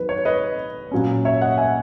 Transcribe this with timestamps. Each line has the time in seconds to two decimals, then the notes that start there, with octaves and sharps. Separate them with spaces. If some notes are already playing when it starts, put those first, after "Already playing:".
Already playing: D#3 F#3 B3 B4
0.09 C#5
0.25 B4 D#5
0.91 A#2 F#3 C#4
1.25 C#5 E5
1.42 D#5 F#5
1.58 E5 G#5